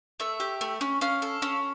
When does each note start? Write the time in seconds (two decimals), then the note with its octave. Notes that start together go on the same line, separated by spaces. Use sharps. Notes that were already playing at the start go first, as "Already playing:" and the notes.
0.20 A3 E5
0.40 G4
0.61 A3
0.81 C#4
1.01 C#4 F5
1.22 A4
1.42 C#4